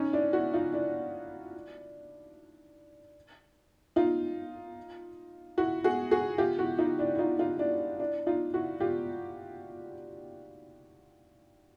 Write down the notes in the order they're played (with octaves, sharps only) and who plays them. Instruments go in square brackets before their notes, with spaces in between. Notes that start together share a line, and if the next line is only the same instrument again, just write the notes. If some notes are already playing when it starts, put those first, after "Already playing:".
Already playing: [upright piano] C#4 D#4
D4 E4
E4 F#4
D#4 F4
D4 E4
D#4 F4
E4 F#4
F#4 G#4
F#4 G#4
F4 G4
E4 F#4
D#4 F4
D4 E4
E4
D#4 F4
D#4 F4
D4 E4
D4 E4
D#4 F4
E4 F#4
F4 G4